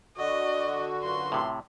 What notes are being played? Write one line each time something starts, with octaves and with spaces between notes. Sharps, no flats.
D3 F#4 D5 D#5
F#2 F4 B4 C6
A2 C3